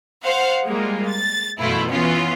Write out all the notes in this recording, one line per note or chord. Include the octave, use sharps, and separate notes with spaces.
C5 F5 F#5
G3 G#3 A#3 F4
A6
F#2 B2 E3 A3 E4 F4
E3 B3 C#4 F4